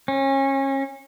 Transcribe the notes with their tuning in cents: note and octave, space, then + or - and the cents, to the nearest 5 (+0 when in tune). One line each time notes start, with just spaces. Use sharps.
C#4 -30